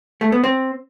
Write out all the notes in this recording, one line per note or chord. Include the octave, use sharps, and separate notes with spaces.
A3
B3
C4